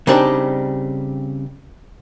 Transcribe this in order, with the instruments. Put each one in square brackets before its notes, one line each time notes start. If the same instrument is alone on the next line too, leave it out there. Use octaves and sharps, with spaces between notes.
[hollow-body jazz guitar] C#3 G3 C4 D4 D#4 G4